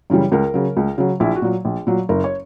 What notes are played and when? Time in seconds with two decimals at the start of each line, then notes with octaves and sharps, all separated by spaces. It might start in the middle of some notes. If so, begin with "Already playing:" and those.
0.10 F#2 C#3 E3 G3
0.32 C#2 A#4
0.54 C#3 F#3
0.77 C#2
0.98 C#3 F#3
1.20 A#1 E4
1.36 F#4
1.42 A#2 F#3
1.65 A#1
1.87 A#2 F#3
2.09 F#1 A#4
2.24 C#5